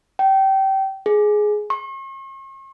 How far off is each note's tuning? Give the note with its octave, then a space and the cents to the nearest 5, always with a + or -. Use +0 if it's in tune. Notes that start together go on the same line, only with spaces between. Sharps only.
G5 -25
G#4 +10
C#6 -45